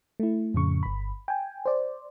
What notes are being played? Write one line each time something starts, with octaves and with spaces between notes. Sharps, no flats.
A3 E4
F2 A2 C#3 C#6
G1 B5
G5 G#5
C5 D5